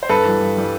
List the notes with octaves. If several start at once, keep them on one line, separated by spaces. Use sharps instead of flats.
C5
G2 A4 B4
E3 G3
G2
E3 G3